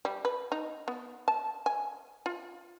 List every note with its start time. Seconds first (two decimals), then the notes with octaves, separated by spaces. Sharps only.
0.05 G3
0.25 B4
0.52 D#4
0.88 B3
1.28 A5
1.66 G#5
2.26 F4